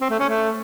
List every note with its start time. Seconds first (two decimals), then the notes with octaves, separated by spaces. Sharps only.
0.01 C4
0.10 A3
0.20 C#4
0.29 A3